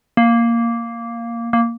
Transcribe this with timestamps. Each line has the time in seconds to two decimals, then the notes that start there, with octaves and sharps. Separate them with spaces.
0.17 A#3
1.53 A#3